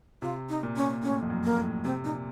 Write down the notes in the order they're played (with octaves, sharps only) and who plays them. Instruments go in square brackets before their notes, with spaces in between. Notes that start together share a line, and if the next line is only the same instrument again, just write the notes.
[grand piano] C3 [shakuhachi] F4
[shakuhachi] D#4
[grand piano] A#2
[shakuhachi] C#4
[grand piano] A2 [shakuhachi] C#4
[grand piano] F2
F#2
[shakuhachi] A#3
[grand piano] A2
[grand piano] C3 [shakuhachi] C4
[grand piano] A#2 [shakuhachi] D#4